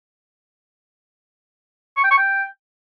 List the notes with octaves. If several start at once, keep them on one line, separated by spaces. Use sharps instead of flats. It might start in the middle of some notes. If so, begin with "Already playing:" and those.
C#6
G5
C#6
G5